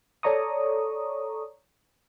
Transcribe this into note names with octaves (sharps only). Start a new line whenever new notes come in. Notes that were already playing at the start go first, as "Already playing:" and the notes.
A4 C#5 D5 A#5 C#6 D#6